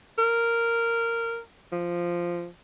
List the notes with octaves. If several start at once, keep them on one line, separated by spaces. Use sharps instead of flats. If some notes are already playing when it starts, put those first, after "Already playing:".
A#4
F3